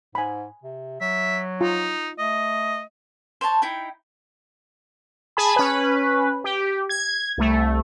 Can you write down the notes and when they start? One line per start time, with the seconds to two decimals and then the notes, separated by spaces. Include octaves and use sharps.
0.15 G#2 G#5 B5
0.64 C3
1.00 F#3 E5
1.61 D#4 F4
2.19 A3 D#5
3.41 C5 C#5 G5 A5
3.62 D#4 E4 G5
5.37 G#4 G#5 A5 B5
5.56 C#4 B4
6.44 G4
6.89 G#6
7.38 C2 A3